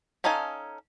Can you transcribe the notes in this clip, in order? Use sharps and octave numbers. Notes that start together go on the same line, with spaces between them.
C#4 D#4 A4 F5 G#5